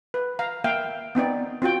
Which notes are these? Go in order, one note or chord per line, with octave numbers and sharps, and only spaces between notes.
B4
F5 A#5
A#3 E5 F5 G5
B3 C4 D#4 D5
C4 F4 F#4 G5